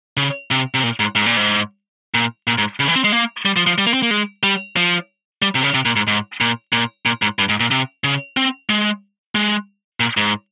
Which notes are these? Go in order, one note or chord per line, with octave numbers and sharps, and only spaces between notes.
C#3
C3
C3
A#2
G#2
G#2
A#2
G#2
A#2
A#2
G#2
C#3
E3
C4
G#3
A#3
G3
F3
F3
G3
A#3
C4
A#3
G#3
G3
F3
G3
C3
C#3
C3
A#2
G#2
G#2
A#2
A#2
A#2
G#2
G2
G#2
A#2
C3
C#3
C4
G#3
G#3
A#2
G#2